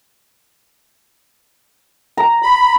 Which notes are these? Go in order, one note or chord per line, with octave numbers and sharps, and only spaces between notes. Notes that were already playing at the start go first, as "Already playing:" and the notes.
A#5
B5